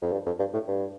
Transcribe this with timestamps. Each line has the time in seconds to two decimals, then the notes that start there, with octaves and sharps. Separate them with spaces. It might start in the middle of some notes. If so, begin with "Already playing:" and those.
0.02 F2
0.12 G2
0.26 F2
0.39 G2
0.53 A2
0.68 G2